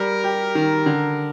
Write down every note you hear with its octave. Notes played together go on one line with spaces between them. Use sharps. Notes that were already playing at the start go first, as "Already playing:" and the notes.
Already playing: G3 A#4
G4
D#3
D3